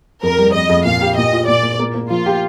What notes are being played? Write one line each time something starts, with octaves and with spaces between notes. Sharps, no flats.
F2 A#4
G3
F2 D#5
F2
A#2 F5
G4
A#2 D#5
F4
A#2 D5
A#2
A#3
A#3
F3 F4
G4